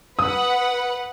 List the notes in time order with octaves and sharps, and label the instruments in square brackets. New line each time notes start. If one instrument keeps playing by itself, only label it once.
[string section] B4 F#5 [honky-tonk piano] D#6